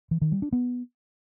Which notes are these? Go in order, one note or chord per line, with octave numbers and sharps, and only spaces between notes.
E3
D#3
G3
D4
B3